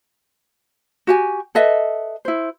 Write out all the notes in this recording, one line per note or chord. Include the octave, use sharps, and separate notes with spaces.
F#4 G4 G#5
A4 B4 D#5 E5
E4 C5